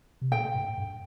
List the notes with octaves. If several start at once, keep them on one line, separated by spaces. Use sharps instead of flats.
C3
A#2 G5
G#2
G2